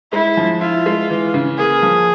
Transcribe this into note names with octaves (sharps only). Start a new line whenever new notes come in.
G#3 E4
F3
E4 F4
G#3
E3
C#3
A#3 G#4
F3